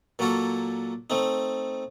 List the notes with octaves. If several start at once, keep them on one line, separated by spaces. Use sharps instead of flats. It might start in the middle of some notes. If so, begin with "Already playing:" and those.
A#2 F#3 A#3 F#4 A4
A3 C4 D#4